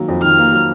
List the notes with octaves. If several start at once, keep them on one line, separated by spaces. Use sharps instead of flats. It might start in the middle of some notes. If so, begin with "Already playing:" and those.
Already playing: D#3 F#3 A#3
F2
D#3 F6
A#3
F#3